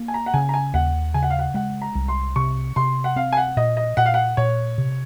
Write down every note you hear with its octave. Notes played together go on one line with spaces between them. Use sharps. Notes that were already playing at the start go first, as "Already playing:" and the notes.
Already playing: A#3
G#5
A#5
F#5
C#3 G#5
A#5
G#5
D#2 F#5
C#3 G#5
F#5
F5
F#5
G#3 F#5
A#5
C2
C6
C3 C#6
C3 C6
F#5
C4 F5
G#5
F#5
A#2 D#5
D#5
A#2 F#5
F5
F#5
A#2 C#5
C3